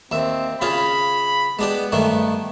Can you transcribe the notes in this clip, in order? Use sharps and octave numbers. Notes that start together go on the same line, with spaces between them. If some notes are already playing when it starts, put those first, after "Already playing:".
D#2 C4 E5
C#3 F4 G#4 B5
G#3 B3 D4 G4
G2 D#3 A3